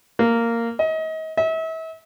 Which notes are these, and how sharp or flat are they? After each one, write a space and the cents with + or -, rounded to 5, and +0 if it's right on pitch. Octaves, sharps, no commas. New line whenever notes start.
A#3 -10
D#5 +35
E5 -35